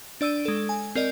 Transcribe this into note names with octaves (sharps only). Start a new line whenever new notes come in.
D4 D5 E6 D7 D#7
G#3 A4
G#5
C4 A#4 D5 D#5